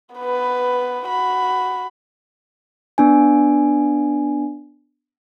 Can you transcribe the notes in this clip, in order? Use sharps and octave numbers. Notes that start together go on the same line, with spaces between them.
B3 B4
F#4 B5
B3 D4 G#5